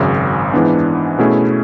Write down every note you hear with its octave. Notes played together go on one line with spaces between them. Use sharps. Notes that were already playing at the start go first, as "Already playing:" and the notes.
Already playing: G#1 F#2 C#3
G#2 E3 B3 D4
B2 A3 C#4 E4 G#4